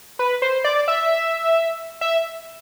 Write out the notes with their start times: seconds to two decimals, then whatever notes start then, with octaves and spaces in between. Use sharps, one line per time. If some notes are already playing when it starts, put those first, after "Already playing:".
0.19 B4
0.42 C5
0.64 D5
0.88 E5
2.01 E5